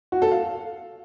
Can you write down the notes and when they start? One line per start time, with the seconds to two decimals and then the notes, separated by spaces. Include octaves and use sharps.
0.12 F#4
0.22 A4
0.31 F5